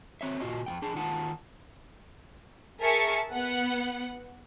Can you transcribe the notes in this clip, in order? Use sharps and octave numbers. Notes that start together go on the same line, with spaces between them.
C4 C#5 E5
A#2 F4 F#4 D#5
F2 G3 G5
D4 G#4 A5
D#3 F4 F#5 A5
G#4 A#4 E5 A5 C#6 C#7
B3 F#5